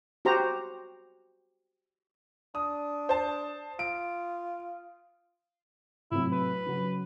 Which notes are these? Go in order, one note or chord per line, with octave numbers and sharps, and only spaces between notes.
F#4 G4 C5 A#5
D4 D#6
C5 A5
F4 D7
A2 C3 F#3 E4
B4
C#3 F#3